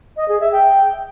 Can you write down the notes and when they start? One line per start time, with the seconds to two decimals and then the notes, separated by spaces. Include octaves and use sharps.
0.17 D#5
0.29 G#4
0.40 E5
0.52 G5